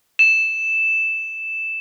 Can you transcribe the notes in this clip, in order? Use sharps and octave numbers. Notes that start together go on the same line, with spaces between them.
E7